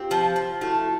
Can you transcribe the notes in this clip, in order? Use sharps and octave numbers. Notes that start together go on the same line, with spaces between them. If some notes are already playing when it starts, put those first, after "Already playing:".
Already playing: C4 F4 G4
F3
F3
A3 E4 F#4